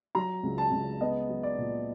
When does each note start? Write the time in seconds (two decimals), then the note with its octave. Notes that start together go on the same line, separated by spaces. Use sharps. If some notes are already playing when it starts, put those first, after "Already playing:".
0.15 F#3 A#5
0.43 C#2
0.58 A5
0.71 C#2
1.01 B3 D#5
1.29 F#3
1.43 D5
1.57 A#2